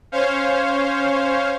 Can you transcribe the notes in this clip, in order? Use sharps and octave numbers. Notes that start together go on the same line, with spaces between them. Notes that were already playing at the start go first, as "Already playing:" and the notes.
C#4 C5 C#5 F5